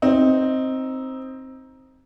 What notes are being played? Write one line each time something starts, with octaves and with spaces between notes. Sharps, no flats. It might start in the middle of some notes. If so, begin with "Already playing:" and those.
C4 D#4